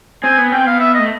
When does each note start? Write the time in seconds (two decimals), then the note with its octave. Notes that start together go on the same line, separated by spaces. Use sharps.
0.23 C4 G#5
0.38 B3
0.52 C4 G5
0.66 B3 F5
0.80 E5
0.94 A3 D#5